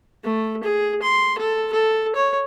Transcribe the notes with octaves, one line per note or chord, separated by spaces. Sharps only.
A3
G#4
C6
A4
A4
C#5